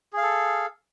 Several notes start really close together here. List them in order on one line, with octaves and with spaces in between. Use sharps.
G#4 F5 A4